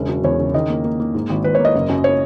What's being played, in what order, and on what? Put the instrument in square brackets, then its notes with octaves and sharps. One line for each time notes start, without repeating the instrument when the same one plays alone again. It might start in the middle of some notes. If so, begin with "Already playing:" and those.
Already playing: [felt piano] E1 C#3
F#3
E2 C#5
C#3
D#3 D#5
A#3
A#3
A#3
G#2
G#1
G#1 B4
C#5
A#3
D#5
F#1
F#2
C#5